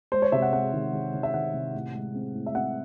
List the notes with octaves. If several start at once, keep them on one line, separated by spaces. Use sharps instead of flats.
G#3 C5
C#5
C3 E5
F#5
C4 F#5
D#3
D#3
D#3
E5
D#3 F#5
C3
A2
G#3
C4
A2
E5
C4 F#5